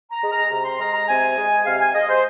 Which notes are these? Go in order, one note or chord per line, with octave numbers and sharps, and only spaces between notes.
A#5
G#3
A#5
C3 A#5
C6
G#3 A#5
A#5
C3 G#5
G#3
C3 F5
G#5
G#3 D#5
C5